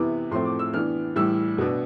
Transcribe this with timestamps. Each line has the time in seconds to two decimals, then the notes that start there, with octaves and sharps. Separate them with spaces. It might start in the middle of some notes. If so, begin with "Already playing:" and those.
Already playing: C3 E3 B3 E4 D6
0.31 A2 F3 A3 C4 C6
0.45 D6
0.59 E6
0.73 E3 B3 D4 F6
1.16 A2 E3 G3 E6
1.58 B2 B3 D4